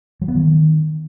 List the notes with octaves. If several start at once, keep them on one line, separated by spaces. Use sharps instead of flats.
F#3
B3
D#3